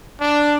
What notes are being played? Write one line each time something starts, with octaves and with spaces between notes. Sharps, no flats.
D4